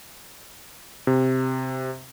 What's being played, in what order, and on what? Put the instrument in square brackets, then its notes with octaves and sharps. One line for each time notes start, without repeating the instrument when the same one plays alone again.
[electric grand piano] C3